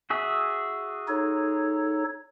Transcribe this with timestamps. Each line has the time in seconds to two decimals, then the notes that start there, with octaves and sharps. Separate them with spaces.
0.10 F#4 G#4 E5
1.08 D#4 A4 C#5